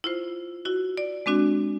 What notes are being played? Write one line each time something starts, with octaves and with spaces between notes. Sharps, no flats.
E4 F4 C5
E4 F#4
D5
G#3 C4 D4 F#4